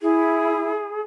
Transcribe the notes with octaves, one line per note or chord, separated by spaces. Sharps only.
E4 G#4